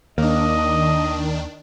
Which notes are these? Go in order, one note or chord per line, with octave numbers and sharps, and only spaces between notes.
D#2 D#3 A#3 D4 D#5